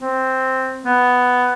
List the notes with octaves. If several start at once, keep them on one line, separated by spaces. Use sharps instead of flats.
C4
B3